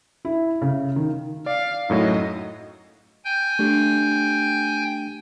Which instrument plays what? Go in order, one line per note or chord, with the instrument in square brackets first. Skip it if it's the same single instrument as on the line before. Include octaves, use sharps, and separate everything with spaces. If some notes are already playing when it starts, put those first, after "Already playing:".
[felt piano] E4
C#3
D#3
[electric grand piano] D5 [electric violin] F5
[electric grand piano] F#2 A2 F#3 [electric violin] D#4 D#5
[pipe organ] G5 G#5 G6
[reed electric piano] A3 D4 G4